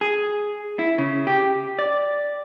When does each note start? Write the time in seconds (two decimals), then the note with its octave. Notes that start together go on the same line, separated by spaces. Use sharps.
0.01 G#4
0.79 E4
0.98 C#3
1.27 G4
1.79 D5